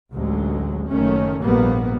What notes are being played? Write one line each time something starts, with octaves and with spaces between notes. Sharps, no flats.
A1 D2 F#3 G#3
F#1 D#3 A3 C#4
A#1 G#2 G3 A#3 B3